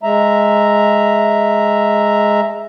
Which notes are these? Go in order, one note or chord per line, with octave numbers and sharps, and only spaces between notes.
G#3 E5 A#5